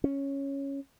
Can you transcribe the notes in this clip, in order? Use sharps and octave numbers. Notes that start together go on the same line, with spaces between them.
C#4